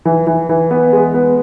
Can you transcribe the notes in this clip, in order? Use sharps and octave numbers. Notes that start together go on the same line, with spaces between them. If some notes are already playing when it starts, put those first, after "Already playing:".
E3
E3
E3
B3
G#3
B3